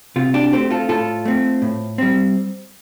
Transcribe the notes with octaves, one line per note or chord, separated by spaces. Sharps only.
C3 F4
D4 G4
A3 C4 G4 C5
F4 A4
A2 F4 A4
A3 C4
A2
G3 C4